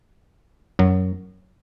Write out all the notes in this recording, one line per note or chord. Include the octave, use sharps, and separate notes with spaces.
F#2 F#3